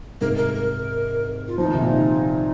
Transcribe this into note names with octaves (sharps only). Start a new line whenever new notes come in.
G#2 C3 A#4
A#4
A#4
F4
F3 D#4
D#3
C3
A#2 D#3